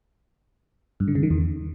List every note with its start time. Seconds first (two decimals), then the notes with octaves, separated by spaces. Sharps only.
1.00 G2
1.08 D3
1.15 C#3
1.23 D#3
1.31 E2